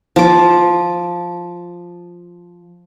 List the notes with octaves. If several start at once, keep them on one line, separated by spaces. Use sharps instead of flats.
F3 D6